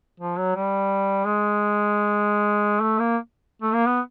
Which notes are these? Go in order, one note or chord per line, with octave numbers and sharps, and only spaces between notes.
F3
F#3
G3
G#3
A3
A#3
A3
A#3
B3